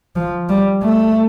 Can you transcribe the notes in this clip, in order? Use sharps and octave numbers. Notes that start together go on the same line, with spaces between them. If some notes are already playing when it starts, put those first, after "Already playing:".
F3
G3
A3